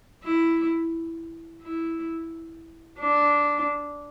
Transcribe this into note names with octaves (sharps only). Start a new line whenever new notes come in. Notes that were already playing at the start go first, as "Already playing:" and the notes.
E4
E4
D4